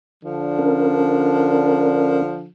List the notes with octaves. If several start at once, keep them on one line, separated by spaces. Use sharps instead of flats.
D3 F3 D4
C#4 A#4